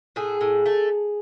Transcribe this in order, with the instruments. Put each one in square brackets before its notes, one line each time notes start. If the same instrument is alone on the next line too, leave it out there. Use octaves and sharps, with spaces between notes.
[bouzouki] A2 G#4
A2
A3